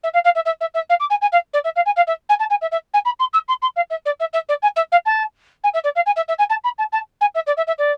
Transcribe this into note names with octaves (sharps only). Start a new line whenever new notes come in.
E5
F5
F5
E5
E5
E5
E5
F5
D6
G#5
G#5
F5
D5
E5
F5
G#5
F5
E5
G#5
A5
G#5
E5
E5
G#5
B5
C6
E6
C6
C6
F5
E5
D5
E5
E5
D5
G#5
E5
F5
A5
G#5
E5
D5
F5
G#5
E5
E5
G#5
A5
B5
A5
A5
G#5
E5
D5
E5
E5
D5